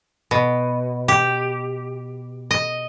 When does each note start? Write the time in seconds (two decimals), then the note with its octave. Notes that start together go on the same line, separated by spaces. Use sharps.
0.31 B2
1.08 G4
2.51 D#5